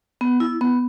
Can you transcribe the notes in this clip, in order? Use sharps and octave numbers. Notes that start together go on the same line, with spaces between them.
B3
E4
B3